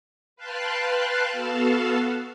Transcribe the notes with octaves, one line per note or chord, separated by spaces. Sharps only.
B4 F5 G5 A5 C6 F#6
B3 F#4 A4 F5 A5